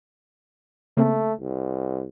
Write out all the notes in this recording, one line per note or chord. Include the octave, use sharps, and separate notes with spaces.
C#3 A3 A#3 C4
C2